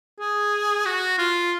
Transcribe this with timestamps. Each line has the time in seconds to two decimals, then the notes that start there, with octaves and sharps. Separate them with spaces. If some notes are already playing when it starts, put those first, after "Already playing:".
0.19 G#4
0.86 F#4
1.18 F4